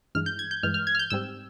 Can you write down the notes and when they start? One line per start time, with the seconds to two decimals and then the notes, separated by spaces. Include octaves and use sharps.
0.15 G2 E3 G#3 F6
0.26 G6
0.39 G#6
0.51 G6
0.63 G2 E3 G#3 F6
0.74 F6
0.87 G#6
0.95 F6
0.99 G6
1.10 G#2 G3 C4 E6